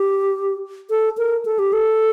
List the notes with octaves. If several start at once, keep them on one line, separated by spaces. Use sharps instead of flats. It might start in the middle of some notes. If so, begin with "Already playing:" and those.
Already playing: G4
A4
A#4
A4
G4
A4